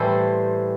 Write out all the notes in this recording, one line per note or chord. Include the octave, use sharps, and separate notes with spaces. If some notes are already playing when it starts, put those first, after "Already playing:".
Already playing: A2 E3 G3 A4 C5